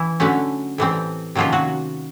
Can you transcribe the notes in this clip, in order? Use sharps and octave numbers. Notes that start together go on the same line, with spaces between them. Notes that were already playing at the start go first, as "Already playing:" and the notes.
Already playing: E3 E4
D3 F#3 A3 C#4
A2 E3 G3 C4
C3 D#3 F3 F#3 A#3 C#4 F4
F#3 F#4